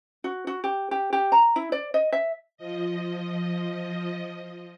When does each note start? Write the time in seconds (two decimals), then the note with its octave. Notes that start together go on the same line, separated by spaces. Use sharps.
0.24 F#4
0.47 F#4
0.64 G4
0.91 G4
1.13 G4
1.32 A#5
1.56 E4
1.72 D5
1.94 D#5
2.12 E5
2.57 F3 D#5